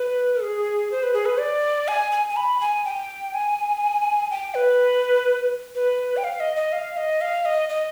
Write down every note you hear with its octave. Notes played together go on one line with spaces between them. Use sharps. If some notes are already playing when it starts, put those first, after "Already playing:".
Already playing: B4
G#4
C5
B4
G#4
B4
D5
G#5
G#5
G#5
B5
G#5
G5
G#5
G5
B4
B4
G5
F5
D#5
D#5
F5
D#5
F5
D#5
D#5